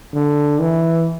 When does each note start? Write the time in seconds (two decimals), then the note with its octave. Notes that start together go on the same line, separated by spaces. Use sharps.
0.14 D3
0.61 E3